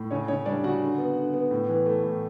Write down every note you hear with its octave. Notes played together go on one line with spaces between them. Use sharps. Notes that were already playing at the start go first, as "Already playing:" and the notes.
Already playing: A2
C#3 C#4 C#5
C#3 C#4 C#5
G3 D4 D5
C#3 F#4 F#5
D3
B3
D3
B3
A2
E3
A3
A2